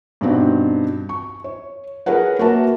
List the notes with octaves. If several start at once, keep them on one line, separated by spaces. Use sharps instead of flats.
G2 B2 C4 D#4 F#4
C#6
C#5
G#4 A#4 B4 C#5 F#5
A#3 F#4 A#4 B4 E5 A5